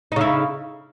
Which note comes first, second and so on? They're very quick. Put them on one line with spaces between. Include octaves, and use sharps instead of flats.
D#4 C#3 E4